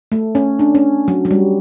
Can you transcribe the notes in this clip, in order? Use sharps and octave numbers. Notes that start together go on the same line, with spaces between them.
A3
C#4
D4
C#4
F#3
F#3
G3